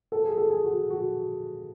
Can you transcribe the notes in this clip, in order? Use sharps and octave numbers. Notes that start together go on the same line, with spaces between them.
A4
G#4
A4
G#4
F#4
F#4